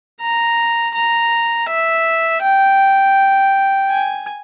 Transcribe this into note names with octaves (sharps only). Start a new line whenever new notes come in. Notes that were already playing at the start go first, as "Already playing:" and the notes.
A#5
A#5
E5
G5
G#5